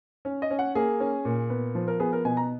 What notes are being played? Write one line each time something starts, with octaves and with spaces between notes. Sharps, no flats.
C#4
D#5
C#4
F#5
A#3 G#4
C#4
A#2
B3
F3
A#4
B3 G#4
A#4
B2 G#5
A#5